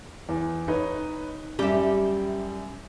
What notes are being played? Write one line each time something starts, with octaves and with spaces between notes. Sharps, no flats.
E2
D#4 B4 C#5
F#2 G3 G4 E5